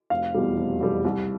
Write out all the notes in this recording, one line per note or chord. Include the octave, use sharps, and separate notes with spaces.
F1 F5
E2 B2 G3
F1
E2 B2 G3
C2